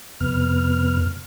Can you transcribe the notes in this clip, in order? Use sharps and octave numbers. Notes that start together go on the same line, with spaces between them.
F2 C3 B3 F6